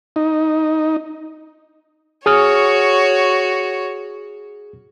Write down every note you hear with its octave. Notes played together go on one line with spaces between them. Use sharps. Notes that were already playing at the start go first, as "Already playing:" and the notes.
D#4
F#4 G#4 C#5 D#6 F6